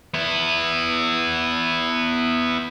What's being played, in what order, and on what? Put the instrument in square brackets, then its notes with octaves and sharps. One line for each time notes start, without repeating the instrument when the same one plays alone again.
[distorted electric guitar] B3 E4